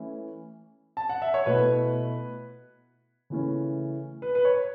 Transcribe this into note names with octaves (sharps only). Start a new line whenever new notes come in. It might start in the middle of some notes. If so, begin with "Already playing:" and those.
Already playing: E3 A3 C#4 E4
A5
F#5
E5
C#5
B2 A3 E4 B4
C#3 E3 A3 C#4
B4
B4
C#5